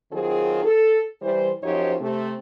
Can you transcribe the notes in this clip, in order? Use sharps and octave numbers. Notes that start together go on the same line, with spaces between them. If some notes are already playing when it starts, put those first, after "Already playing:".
D#3 F#3 C4 F4 G#4
A4
E3 G3 C5
F#2 F3 D#4 G4 C5 C#5
C3 A3 C4